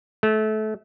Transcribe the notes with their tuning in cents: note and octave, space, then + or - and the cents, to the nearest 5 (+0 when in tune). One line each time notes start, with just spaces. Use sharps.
A3 -25